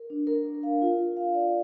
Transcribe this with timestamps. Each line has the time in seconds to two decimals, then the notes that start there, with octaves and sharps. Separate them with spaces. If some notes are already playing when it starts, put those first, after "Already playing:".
Already playing: A#4
0.10 D4
0.27 A#4
0.45 D4
0.63 F5
0.82 F4
0.99 A#4
1.17 F5
1.34 D5